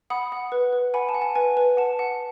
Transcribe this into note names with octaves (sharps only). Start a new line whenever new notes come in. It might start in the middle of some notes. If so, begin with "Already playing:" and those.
F#5 B5 D#6
F#5
B4
B4
F#5 G#5 B5
A5
F#5
G#5
B4 G#5
B4
F#5 A5
F#5